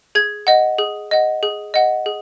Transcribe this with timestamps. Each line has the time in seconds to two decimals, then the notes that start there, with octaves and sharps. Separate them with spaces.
0.15 G#4 G#6
0.47 D#5 F#5
0.78 G#4
1.11 D#5 F#5
1.43 G#4
1.74 D#5 F#5
2.06 G#4